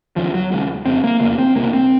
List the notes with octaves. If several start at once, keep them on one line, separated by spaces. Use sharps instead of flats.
D#2 C#3 F3
F#3
D#2 C#3 G#3
F2 C#3 C4
A#3
F2 C#3 A#3
C4
C2 C3 A#3
C4